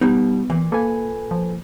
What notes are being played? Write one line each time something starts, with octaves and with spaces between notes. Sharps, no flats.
B2 G3 B3 D#4
A#2 E3
A#3 A4 B4 G#5
F3